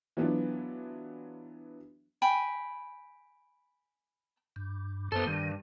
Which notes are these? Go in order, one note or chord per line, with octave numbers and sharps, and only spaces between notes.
E3 F#3 B3 D4 F4
G5 G#5 B5
G2
F#2 B3 A4 C5
G2 D#3